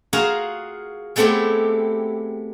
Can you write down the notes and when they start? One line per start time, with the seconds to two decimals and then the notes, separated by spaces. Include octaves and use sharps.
0.13 F4 F#4 G#4 A#4 F5 A#5
1.16 G#3 A3 B3 C4 E4 G4